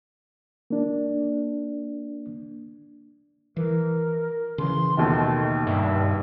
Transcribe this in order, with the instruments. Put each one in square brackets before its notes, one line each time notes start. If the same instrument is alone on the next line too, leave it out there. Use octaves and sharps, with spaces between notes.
[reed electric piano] A#3 D4
[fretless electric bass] E3 [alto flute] A#4
[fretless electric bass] C#3 E3 [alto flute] C6
[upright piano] D#2 B2 D#3 [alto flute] A3
[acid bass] G2 [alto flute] E5